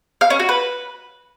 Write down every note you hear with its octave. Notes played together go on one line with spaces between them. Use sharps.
F5
C#4
F#4
B4